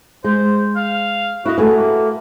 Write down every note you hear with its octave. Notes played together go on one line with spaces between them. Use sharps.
G#3 C5
F5
E4 F#4 D#5
A3 F#4 G#4 B4
A#3